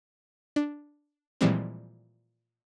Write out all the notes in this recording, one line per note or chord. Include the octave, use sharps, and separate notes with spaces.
D4
A#2 E3 F3 G3 G#3 C4